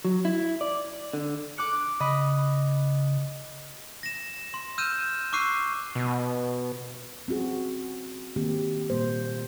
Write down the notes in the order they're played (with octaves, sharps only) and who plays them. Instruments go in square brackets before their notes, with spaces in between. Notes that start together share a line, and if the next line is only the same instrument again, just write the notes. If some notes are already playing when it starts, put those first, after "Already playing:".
[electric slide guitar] F#3
E4
D5
D3
[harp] D6 F#6 C#7
[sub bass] C#3 [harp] D#5 B5
[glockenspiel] A#6 E7
C6
E6 F6 G6 D#7 E7
C#6 D6 E6 F#6 C7 D#7
[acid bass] B2
[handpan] C4 C#4 F#4 G#4
D#3 A#3 C4 G4
A#2 G3 A#3 C5